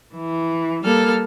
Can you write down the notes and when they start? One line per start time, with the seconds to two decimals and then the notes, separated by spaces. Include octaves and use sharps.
0.14 E3
0.84 G3 A#3 A4 F6